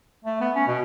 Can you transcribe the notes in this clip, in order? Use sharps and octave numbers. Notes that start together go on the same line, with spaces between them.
A3
B3
C#4
B2